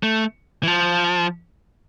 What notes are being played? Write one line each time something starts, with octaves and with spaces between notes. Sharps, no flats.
A3
E3
F3